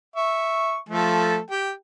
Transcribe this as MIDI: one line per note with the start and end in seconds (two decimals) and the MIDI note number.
0.16 0.76 76
0.16 0.76 85
0.89 1.39 53
0.89 1.39 57
0.89 1.39 69
1.51 1.71 67
1.51 1.71 79